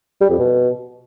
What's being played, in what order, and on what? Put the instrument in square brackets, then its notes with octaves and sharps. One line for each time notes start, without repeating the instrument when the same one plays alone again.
[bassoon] G3
F2
B2